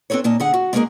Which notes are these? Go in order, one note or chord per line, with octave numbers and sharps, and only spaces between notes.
C4 D4 A4 B4 C#5
A#2 A#3 D#4 A5
D3 G#4 F#5
F#4
G#3 A#3 C#4 D#4 G#4 A#4